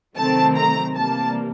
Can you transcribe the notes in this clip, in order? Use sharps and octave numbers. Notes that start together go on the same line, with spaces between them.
C3 D#3 F#3 A3 C4 A5
A#5
C3 E3 G3 A#3 A5